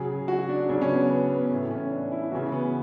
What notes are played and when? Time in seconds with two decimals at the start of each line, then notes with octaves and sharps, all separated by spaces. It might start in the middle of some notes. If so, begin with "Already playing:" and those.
Already playing: C#3 F#3 G#4
0.28 F#4
0.49 D4
0.69 C#3 F#3 D4
0.81 C#4
0.89 B3
1.10 B3
1.30 B3
1.51 A2 E3 A3
1.71 C#4
1.91 D4
2.12 E4
2.32 C#3 E3 F#4
2.52 B3